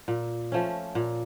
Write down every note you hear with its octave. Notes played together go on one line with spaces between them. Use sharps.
A#2
F3 A3 C#4
A#2